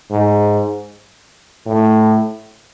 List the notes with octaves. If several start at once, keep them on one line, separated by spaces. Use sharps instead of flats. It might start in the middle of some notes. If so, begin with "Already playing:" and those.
G#2
A2